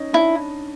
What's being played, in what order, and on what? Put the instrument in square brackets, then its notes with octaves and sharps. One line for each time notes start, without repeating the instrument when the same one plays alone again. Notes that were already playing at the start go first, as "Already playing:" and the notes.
Already playing: [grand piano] C#4 D#4 C#5 D#5
[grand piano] D4 D5 [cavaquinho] E4